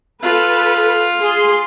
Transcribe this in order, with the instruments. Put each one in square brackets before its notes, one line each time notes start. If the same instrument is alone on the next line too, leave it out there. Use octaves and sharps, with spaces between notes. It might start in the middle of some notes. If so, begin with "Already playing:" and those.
[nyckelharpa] F4 [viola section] A4 B4
[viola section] G#4 C6